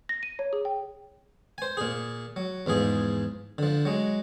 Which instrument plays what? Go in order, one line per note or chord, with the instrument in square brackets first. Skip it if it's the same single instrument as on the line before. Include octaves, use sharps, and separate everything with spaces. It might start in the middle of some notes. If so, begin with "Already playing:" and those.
[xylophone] A#6
D#7
C#5
G#4
G5
[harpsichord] C5 G#5
A#2 G#4
F#3
E2 G#2 F3 G#4
D3 F3
F#3 G#3